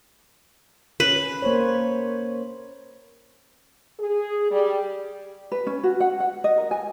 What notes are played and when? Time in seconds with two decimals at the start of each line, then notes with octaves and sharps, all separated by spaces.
1.00 C#4 B4
1.42 A#3 C5 C#5
3.99 G#4
4.50 G3
5.52 B4
5.67 C#4
5.83 F#4
6.00 F#5
6.20 F#5
6.44 D#5
6.57 A#4
6.71 G#5